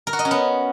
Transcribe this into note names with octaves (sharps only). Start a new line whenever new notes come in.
A#4
F#4
D#5
C#4
B3